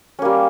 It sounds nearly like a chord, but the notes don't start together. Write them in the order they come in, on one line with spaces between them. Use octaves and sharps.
C#4 A#3 G3